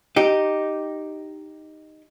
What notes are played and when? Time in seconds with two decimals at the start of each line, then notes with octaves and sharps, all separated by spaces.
0.16 D#4 G4